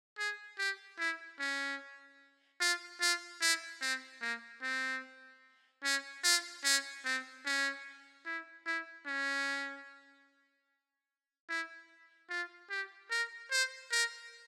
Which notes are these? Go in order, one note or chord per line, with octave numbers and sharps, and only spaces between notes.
G#4
G4
E4
C#4
F4
F4
E4
C4
A#3
C4
C#4
F4
C#4
C4
C#4
E4
E4
C#4
E4
F4
G4
A#4
C5
A#4